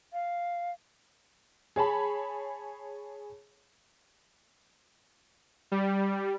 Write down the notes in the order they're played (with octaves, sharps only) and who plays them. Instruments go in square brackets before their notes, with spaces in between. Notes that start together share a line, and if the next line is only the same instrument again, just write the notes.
[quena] F5
[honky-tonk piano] G#4 C#5 A5 B5
[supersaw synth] G3